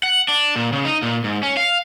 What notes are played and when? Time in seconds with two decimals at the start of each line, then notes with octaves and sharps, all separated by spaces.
0.03 F#5
0.28 D4
0.56 A#2
0.72 C#3
0.85 D#4
1.03 A#2
1.24 G#2
1.43 C#4
1.57 F5